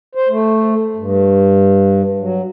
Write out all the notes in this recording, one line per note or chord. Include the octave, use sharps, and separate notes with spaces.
C5
A3
G2
F#3